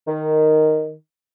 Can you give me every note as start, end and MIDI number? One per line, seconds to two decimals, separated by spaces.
0.07 0.94 51